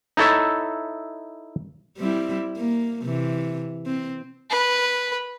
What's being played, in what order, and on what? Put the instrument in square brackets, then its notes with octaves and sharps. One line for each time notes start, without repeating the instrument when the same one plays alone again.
[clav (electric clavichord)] D#4 E4 A4 C#5 E5
[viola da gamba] G3 C4 E4
A#3
C3 E3
C4
[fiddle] B4